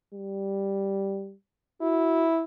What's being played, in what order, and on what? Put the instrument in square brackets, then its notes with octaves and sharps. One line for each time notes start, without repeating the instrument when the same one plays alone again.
[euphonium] G3
[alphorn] E4 [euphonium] F#4